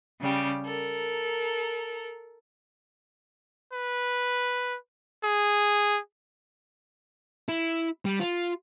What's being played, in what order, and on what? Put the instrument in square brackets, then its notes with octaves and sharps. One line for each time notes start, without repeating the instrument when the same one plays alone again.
[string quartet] C#3 G3 G4
A4 A#4
[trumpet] B4
G#4
[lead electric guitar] E4
G3
F4